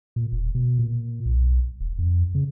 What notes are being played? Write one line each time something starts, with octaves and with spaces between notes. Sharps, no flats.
A#2
E1
B2
A#2
B1
D#1
F2
C#3